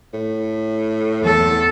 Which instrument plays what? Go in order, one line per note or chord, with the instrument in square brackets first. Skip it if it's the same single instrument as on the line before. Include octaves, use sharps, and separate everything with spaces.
[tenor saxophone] A2
[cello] E2 A4